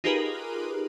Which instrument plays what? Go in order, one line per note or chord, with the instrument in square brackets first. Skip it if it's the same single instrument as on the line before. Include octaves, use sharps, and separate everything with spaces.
[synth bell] D#4 F4 G4 G#4 A#4 B4